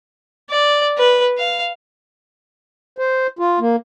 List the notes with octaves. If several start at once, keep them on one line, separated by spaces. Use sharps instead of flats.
D5
B4
F5
C5
F4
A#3